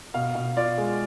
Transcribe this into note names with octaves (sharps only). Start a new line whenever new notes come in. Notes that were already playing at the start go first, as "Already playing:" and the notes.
B2 F5
B2
F4 D5
G#3